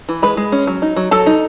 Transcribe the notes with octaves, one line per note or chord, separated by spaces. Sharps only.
E3
G#3 B4 B5
G#3
C#4
F#3
D#4
F#3
F#3 A4 A5
D#4